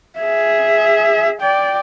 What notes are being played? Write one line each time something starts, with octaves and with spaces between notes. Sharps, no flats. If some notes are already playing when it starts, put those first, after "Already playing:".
G#4 E5
D5 G5